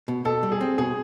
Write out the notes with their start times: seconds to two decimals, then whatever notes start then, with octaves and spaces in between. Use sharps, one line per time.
0.08 B2
0.25 B2 A4
0.43 G3
0.52 G#4
0.61 C4
0.78 B2 G#4